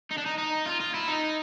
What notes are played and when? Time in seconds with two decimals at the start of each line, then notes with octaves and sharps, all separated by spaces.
0.11 D#4
0.17 D4
0.26 D#4
0.38 D#4
0.66 F4
0.80 F4
0.94 E4
1.08 D#4